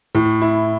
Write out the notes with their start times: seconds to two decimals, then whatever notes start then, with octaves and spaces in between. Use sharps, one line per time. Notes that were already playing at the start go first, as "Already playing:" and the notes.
0.15 A2
0.42 E4